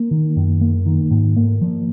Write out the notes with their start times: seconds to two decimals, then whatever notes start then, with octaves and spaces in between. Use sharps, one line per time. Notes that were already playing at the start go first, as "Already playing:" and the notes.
Already playing: A#3
0.11 D#3
0.36 F#2
0.61 A#3
0.86 D#3
1.11 G#2
1.37 A#3
1.62 F3